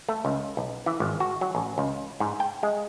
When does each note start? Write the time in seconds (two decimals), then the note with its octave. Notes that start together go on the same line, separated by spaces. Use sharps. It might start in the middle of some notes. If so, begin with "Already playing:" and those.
0.09 A3
0.25 C#2
0.57 B1
0.86 E3
1.00 G#1
1.20 F#4
1.41 F#3
1.55 A1
1.78 C#2
2.20 G#2
2.40 G5
2.63 G#3